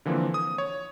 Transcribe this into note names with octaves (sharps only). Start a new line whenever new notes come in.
D3 E3 F3 A#3 C4
D#6
C#5